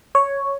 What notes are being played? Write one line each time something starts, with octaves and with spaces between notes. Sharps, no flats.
C#5